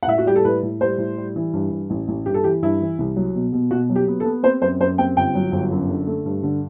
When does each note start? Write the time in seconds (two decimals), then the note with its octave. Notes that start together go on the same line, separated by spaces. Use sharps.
0.03 F#5
0.07 A2 E5
0.18 F#4
0.26 G3 G4
0.36 A4
0.44 A2 B4
0.63 A2
0.80 G3 C5
0.98 A2
1.17 G3
1.36 E3
1.53 G2
1.71 G2
1.90 A1
2.08 A1
2.26 G2 G4
2.34 A4
2.44 E3 G4
2.63 G2 E4
2.81 E3
2.99 C2
3.16 F#3
3.35 B2
3.53 B2
3.71 B2 F#4
3.89 F#3
3.96 G4
4.08 B3
4.20 A4
4.25 B3
4.43 C4 C5
4.62 F#2 C5
4.80 F#2 C5
4.98 C4 G5
5.17 G1 G5
5.35 F#3
5.52 G1
5.71 F#2
5.89 D3
6.07 A3
6.26 G2
6.43 D3